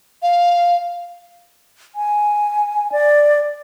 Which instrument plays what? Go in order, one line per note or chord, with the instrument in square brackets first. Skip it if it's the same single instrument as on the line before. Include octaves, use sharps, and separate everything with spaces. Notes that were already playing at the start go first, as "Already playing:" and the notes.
[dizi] F5
[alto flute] G#5
D5